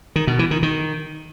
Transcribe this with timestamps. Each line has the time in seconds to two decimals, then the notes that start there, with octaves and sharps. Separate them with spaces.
0.16 D#3
0.27 B2
0.39 E3
0.51 D#3
0.63 D#3